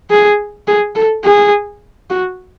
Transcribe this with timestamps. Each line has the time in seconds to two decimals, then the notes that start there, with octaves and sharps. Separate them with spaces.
0.10 G#4
0.67 G#4
0.95 A4
1.24 G#4
2.10 F#4